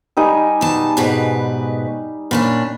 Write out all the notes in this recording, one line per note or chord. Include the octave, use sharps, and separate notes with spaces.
G3 D#4 G#5
B2 A5
G#2 B2 B4
A#2 C#4 D4 B5